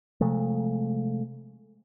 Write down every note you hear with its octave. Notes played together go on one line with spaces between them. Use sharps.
C3 F3 G#3 A3